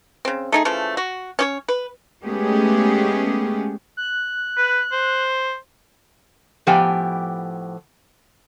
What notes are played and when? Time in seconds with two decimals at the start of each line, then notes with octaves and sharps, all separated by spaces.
0.25 C#3 C4
0.52 A3 D#4 G#4
0.65 C#3 E3 F3 A3
0.97 F#4
1.39 C#4 G4 C#5
1.68 B4
2.24 G#3 A3 B3 C#4 G4 G#4
3.97 F#6
4.57 B4
4.92 C5
6.67 A2 F3 B3 G4 G5 G#5